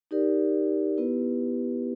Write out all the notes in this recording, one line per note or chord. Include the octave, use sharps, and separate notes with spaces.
D#4 G4 A#4 D5
B3 E4 G4 B4